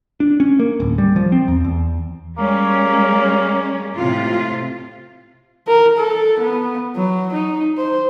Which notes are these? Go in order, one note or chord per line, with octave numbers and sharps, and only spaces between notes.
D4
C#4
A#3
D1
G3
F3
C4
E2
E2
G3 G#3 A#3 C#4
A2 C3 F4
A#4
A4
B3
F#3
D#4
C5